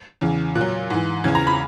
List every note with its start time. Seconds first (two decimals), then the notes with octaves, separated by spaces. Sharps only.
0.21 E2 C#3 E3
0.55 A#2 F#6
0.61 F#3
0.90 G#2 E3
1.24 E2 C#3 E3 G#6
1.35 A#5
1.47 B5